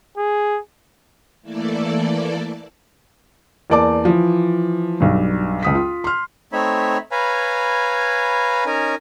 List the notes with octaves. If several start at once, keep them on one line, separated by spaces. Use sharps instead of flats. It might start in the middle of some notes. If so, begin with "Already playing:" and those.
G#4
E3 A3 A#3 E4 A4 D5
E2 A#3 D5 A5 D6
E3 F3
B1 G2
C#2 D#6 B6
F4
C6 F6
A3 C4 D#4 C#5 E5 B5
B4 C#5 F5 G#5 A#5 B5
C#4 D#4 A#4 G#5 A#5